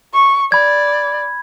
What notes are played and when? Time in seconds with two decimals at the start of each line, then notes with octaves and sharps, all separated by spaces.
0.14 C#6
0.52 D5 B5 G#6